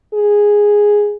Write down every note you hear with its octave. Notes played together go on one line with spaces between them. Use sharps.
G#4